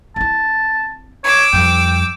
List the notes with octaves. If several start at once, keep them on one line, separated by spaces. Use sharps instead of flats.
C4 E4 A5
C#5 D6 E6
F2 G3 G5